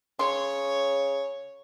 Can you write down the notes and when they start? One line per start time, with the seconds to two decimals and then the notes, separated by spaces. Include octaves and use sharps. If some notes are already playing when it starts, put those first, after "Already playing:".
0.19 C#3 C#5 C6